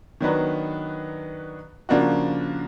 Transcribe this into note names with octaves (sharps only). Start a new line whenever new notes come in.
D#3 F#3 B3 D4
C#3 F3 A#3 D4 F#4